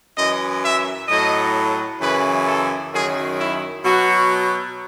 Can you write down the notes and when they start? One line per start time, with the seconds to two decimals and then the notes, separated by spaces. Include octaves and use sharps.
0.16 F#2 E3 D#5
0.62 E5
1.08 A2 F#3 D#5
2.00 F#2 C#3 E3 B4
2.46 A4
2.91 F#2 D#3 F#3 G#4
3.38 E4
3.83 B2 F#3 F#4